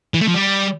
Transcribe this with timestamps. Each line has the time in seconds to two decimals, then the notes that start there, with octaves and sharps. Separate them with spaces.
0.14 E3
0.21 A3
0.28 F3
0.34 G3